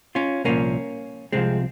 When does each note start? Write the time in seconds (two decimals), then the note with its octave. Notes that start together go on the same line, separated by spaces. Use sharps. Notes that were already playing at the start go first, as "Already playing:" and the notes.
0.15 C#4 F4
0.44 C2 A#2 F3 A#3 C#4
1.32 C2 C3 F3 G#3 C4